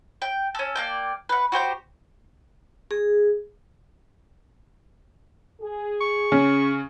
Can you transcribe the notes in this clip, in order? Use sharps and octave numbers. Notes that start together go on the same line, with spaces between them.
G5
C#4 A4
A#3 D5 G5
B4 F#5
F#4 G4 C5 G5
G#4
G#4
C#6
C#3 C#4